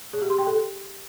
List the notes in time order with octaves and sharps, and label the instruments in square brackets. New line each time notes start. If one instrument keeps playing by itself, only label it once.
[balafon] G#4
G4
C6
G5
A4